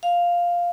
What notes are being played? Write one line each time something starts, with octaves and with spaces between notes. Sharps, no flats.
F5